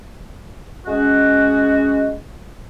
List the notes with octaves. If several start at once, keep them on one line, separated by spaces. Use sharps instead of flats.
G#3 C#4 F#4